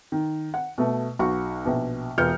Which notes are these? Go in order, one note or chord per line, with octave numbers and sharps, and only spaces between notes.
D#3
F#5
B2 A3
B1 F#4 C#6
A#1 B2
E1 B3 F4 F6 G6 C#7